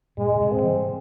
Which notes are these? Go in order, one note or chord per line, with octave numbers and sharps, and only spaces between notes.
G2 A#2 G#3
C#3
G#2 C3
C4
E3 G3